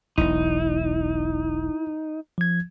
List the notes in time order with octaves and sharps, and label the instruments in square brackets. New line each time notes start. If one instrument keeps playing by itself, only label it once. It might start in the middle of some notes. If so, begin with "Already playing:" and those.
[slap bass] E1 B1 [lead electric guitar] D#4 [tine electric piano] E4
[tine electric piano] F3 G#6